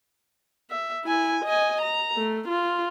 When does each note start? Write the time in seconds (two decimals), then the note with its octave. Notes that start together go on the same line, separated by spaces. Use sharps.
0.70 E5
1.05 E4 G#5
1.45 D#5 G#5
1.82 A#5
2.17 A3
2.49 F4